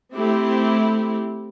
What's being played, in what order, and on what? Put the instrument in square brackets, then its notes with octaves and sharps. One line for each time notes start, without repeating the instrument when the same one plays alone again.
[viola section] A3 C4 E4 G4